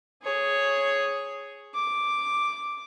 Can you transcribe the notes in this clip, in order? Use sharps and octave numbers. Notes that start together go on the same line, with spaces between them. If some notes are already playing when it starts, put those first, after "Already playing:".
G#4 C#5
D6